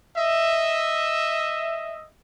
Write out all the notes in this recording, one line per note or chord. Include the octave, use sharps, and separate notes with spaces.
D#5 E5